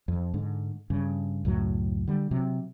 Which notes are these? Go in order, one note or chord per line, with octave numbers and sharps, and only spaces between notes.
F2
G#2 D3
G2 C#3
C#2 F#2 A2 F#3
D3 G3
C3 F#3